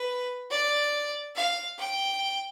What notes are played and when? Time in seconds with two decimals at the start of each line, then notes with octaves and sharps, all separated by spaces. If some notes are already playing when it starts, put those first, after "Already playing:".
Already playing: B4
0.51 D5
1.35 F5
1.78 G5